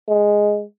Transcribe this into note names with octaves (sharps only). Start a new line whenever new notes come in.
G#3